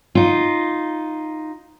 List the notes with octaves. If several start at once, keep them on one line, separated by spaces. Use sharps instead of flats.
D#4 F4